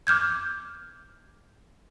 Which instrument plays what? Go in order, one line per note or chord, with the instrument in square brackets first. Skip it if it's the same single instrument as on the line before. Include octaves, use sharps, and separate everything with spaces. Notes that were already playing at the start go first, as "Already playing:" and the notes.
[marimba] D6 F6 G6 G#6